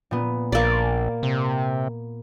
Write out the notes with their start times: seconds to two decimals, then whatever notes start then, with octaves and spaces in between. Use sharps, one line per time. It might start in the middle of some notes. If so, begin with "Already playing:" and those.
0.11 A#2 B3
0.52 A#1 A#3 D5
1.23 C3